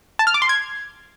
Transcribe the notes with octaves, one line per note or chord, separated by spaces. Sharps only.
A5
F6
D6
C6
G#6